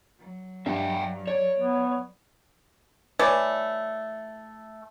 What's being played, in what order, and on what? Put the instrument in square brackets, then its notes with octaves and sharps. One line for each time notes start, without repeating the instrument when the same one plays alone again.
[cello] F#3
[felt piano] G2 [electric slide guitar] E5 F#5 G5
[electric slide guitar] C#5 [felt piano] D5
[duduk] B3
[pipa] E3 A3 C#5 D5